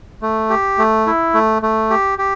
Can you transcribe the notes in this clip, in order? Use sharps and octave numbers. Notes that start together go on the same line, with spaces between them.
A3
G4
A3
E4
A3
A3
G4
G4